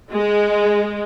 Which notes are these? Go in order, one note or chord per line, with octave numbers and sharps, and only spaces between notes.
G#3